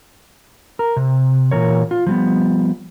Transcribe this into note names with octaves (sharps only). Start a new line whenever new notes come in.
A#4
C3
A#2 E3 A#4 C#5
F4
F3 G3 B3